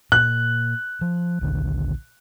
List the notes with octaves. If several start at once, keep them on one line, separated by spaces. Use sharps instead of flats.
A#2 F#6
F3
A#1 D#2 D3